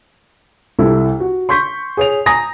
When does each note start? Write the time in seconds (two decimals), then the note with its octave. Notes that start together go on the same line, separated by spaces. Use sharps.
0.79 C2 E4 A4
1.20 F#4
1.49 C6 C#6 G6 B6
1.97 G#4 C#5 F7
2.26 G#5 A#5 D#6 A#6